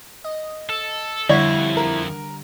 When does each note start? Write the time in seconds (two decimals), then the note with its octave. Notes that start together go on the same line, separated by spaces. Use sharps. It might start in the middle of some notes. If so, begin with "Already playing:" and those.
0.24 D#5
0.69 A4 E6
1.29 F2 D3 G3 E4 C#5 F#5
1.77 A#4